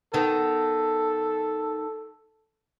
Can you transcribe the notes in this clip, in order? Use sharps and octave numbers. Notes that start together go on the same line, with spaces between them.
D#3 B3 A4